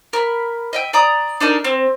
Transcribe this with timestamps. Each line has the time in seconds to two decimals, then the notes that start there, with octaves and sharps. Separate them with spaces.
0.13 A#4 B5
0.73 D#5 E5 G5
0.93 D5 A#5 D#6
1.40 D4 D#4 A4 A#4
1.64 C4